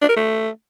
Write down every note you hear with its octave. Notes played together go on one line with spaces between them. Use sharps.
D4
A#4
A3